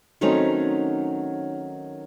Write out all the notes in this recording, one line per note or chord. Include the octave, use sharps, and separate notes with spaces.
D#3 F#3 A3 C4 C#4 D#4